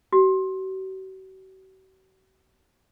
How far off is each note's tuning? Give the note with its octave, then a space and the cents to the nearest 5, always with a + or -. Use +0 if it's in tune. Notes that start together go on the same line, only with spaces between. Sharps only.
F#4 +45